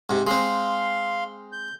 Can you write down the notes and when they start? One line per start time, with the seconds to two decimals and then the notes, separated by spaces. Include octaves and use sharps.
0.09 G#2 C3
0.27 G#3 C4 F5 C6
1.52 G6